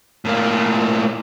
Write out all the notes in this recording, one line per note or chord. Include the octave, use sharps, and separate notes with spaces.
A2 A#3